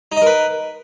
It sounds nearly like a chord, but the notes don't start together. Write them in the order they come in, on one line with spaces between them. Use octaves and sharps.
D#4 D#5 A#4 B4